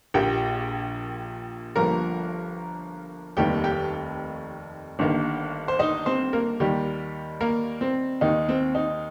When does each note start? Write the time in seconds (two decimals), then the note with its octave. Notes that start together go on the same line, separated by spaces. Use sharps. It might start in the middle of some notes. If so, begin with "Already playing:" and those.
0.14 A#1 A#2 A#3 G4 G5
1.76 G1 G2 F3 A#3 A#4 A#5
3.37 F1 D#2 D#3 G3 A#3 G4 G5
3.64 G4 G5
4.99 G1 G2 D#3 A#3
5.68 C5
5.79 D#4 D#5
6.06 C4 C5
6.33 A#3 A#4
6.60 D#2 D#3 G3 A#3 G4
7.41 A#3 A#4
7.81 C4
8.21 D#2 D#3 A#3 D#4
8.49 C4
8.75 D#4